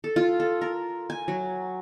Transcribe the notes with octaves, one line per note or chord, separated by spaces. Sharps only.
A4
F4
A4
A#4
G#5
F#3